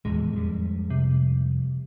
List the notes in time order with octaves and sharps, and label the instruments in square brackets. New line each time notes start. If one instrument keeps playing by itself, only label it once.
[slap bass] D#1 E2 A2 [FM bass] G#3
[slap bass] F2 G3
[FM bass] C3